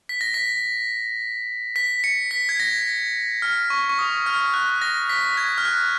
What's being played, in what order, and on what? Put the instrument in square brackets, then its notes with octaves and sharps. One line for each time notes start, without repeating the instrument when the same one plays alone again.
[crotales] B6
A#6
B6
B6
C#7
B6
G#6
A#6
F6
C#6
C#6
D#6
F6
F#6
A#6
B6
G#6
F6
F#6